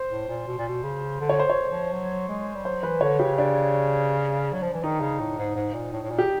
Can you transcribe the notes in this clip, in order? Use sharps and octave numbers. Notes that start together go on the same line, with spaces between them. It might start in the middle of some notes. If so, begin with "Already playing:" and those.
Already playing: C5
A2
A#2
B2
A#2
B2
C#3
D3
C#5
C5
C#5
F3
F#3
G#3
G3
F#3 C5
E3 B4
D3 C#5
C#3 G4
D4
F#3
F3
E3
D#3 D#4
C#3
A2
G#2
G#2
A#2
A2
A2
A#2
G4